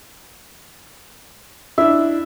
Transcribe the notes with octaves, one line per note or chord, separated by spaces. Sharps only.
D4 E4 E5